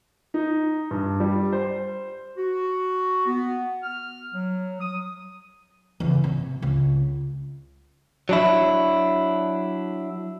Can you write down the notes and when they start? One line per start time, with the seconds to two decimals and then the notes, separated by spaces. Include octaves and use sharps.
0.34 D#4
0.91 G2
1.20 G3
1.53 C5
2.37 F#4
3.26 B3
3.83 F6
4.33 F#3
4.81 D#6
6.00 E2 C#3
6.24 C3
6.62 C#2
8.29 F#3 D4 E4